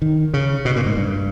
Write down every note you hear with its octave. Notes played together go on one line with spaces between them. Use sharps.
D#3
C#3
B2
A#2
G#2
G2